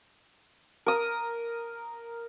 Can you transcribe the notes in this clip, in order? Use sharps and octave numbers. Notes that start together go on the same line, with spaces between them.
A#4 D#6